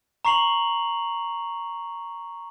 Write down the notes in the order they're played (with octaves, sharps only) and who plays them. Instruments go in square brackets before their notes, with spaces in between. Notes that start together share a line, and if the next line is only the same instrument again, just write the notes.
[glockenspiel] A#5 C#6 C7 F7 F#7